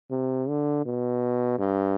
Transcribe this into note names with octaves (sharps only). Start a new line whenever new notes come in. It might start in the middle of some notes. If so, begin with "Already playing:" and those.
C3
D3
B2
G2